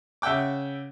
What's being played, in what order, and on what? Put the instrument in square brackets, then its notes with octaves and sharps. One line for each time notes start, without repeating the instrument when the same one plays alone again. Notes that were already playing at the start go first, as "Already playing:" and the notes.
[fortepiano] C#3 E5 F#5 G5 D6